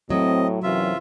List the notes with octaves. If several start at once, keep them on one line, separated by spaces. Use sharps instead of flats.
A2 F#3 C4 D#5
F#2 C3 E3 F4 E5